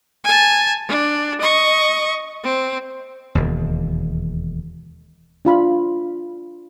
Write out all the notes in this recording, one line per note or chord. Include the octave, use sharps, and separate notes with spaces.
G#5 A5
D4
D#5 C#6
C4
E1 D#2
D4 F4 B5